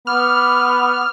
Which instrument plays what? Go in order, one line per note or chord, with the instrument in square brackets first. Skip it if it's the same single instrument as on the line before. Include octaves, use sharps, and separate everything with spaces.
[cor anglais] B3 [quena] B5 [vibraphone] D6 [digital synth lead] F6